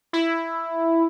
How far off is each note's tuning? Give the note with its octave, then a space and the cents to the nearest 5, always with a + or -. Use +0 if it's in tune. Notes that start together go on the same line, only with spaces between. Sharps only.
E4 +5